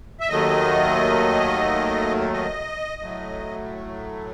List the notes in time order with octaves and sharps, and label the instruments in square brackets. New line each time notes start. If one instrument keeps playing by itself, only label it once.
[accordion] E5
D#2 D#3 F#3 A3 D#5
D#5
A2 F#3 A3